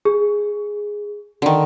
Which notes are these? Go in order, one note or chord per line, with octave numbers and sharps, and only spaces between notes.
G#4
D3 D#3